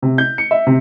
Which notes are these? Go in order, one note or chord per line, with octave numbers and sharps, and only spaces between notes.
C3
G6
C#7
E5
C3